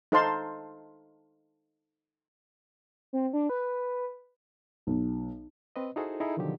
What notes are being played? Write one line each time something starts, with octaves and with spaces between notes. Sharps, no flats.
D#4 A4 C5 F5 A5 C6
C4
D4
B4
B1
C4 B4 D#5
D#4 E4 F#4 G#4 A4 C5
D#4 E4 G#4 A4
B2 D3 D#3 F3 F#3 G4